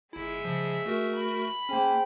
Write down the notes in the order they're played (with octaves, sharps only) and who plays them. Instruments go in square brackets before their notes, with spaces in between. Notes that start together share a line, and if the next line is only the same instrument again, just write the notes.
[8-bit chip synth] G1 E4 [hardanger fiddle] G#3 E5
[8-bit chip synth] C#3 F3
A3 F#4 A#4
[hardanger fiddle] B5
[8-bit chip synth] A#3 C#4 [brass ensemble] G#4 C5 G5